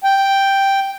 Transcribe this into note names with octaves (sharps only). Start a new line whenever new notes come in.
G5